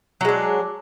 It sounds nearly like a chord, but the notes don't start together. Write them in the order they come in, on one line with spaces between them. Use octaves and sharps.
F#3 G#3 D4